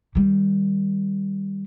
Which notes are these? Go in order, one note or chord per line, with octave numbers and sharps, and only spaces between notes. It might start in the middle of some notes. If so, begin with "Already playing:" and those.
D#3 G3